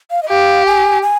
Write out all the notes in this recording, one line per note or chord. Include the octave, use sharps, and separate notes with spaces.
F5
D#5
G4 F5
G#5
G#5